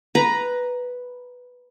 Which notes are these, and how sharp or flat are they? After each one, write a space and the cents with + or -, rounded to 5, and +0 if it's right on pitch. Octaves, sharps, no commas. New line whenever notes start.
B4 +0 A#5 +10